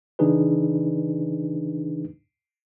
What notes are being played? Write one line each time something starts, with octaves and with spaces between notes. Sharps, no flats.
C#3 E3 D4 D#4 G#4 B4